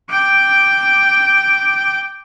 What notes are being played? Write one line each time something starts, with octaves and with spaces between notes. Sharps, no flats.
G5 D6